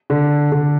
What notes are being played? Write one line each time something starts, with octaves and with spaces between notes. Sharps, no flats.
D3
D3